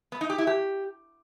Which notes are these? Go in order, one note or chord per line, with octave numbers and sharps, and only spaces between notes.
B3
D#4
G4
E4
G4